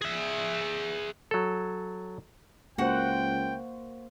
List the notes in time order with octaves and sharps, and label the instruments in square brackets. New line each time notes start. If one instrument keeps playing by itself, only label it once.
[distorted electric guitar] G#4 E5
[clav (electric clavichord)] F#3 A4
[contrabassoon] C#2 [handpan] A#3 C5 [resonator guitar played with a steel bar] F#4 F#5 [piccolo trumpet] G5